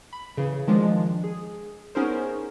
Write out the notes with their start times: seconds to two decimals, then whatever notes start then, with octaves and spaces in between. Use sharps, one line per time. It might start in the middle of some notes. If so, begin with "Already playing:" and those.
0.13 B5
0.37 C#3 E3
0.67 D#3 F3 G#3 D4 F4
1.24 G#4
1.95 B3 C#4 D#4 G#4 A#4 C5